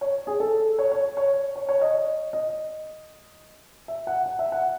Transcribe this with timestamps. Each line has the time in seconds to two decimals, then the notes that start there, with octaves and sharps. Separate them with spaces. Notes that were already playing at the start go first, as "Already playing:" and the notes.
0.01 C#5
0.27 G#4
0.40 A4
0.78 C#5
0.92 C#5
1.17 C#5
1.56 C#5
1.69 C#5
1.81 D#5
2.33 D#5
3.88 E5
4.07 F#5
4.26 F#5
4.39 E5
4.52 F#5